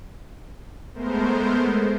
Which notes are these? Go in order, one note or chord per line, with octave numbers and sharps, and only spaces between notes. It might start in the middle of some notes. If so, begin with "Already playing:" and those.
G#3 A3 B3 A#4 C5